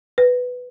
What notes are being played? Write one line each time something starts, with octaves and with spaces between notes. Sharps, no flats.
B4